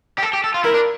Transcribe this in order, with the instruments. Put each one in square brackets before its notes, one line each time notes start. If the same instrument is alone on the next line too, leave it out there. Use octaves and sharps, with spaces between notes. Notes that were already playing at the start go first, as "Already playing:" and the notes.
[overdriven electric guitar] G4
A4
G4
A4
F4
[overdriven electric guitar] E4 [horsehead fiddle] A#4
[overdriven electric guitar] D4